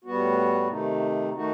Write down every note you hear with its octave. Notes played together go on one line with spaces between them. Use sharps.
A2 G3 B3 F#4
C3 D#3 A3 D#4
D#3 A3 D#4 F#4